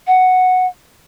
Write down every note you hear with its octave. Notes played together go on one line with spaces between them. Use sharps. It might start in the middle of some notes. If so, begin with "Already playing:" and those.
F#5